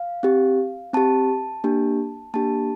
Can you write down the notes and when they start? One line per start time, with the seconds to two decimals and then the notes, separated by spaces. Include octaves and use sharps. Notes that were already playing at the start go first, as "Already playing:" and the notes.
Already playing: F5
0.23 C4 G4
0.93 C4 G4 A5
1.64 A#3 D4 G4
2.34 A#3 D4 G4 A5